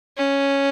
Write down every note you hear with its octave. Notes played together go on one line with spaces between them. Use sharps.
C#4